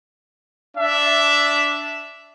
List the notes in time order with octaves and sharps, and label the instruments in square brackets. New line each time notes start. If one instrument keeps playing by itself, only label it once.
[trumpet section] D4 E5